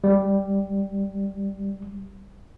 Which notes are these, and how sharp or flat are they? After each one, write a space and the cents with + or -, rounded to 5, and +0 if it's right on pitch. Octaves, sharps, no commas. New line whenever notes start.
G3 +0